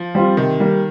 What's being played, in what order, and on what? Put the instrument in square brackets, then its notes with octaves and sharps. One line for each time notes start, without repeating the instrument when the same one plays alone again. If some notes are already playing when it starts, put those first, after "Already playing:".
Already playing: [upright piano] F3
[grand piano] G3 C4 F4
[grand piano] C3 [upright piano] D#3
[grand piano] G3 A#3